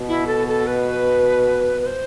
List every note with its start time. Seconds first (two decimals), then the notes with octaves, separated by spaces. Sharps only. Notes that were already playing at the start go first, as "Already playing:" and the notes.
Already playing: B2
0.08 E4
0.27 A4
0.48 A4
0.67 B4
1.81 B4
1.86 C5